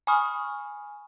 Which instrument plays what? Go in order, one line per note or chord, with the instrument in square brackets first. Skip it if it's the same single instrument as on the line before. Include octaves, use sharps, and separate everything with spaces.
[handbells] G#5 B5 C#6 D#6 F6